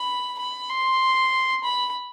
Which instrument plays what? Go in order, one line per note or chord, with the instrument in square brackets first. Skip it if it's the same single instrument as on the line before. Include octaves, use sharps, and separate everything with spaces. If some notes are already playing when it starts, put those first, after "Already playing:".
Already playing: [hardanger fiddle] B5
B5
C6
B5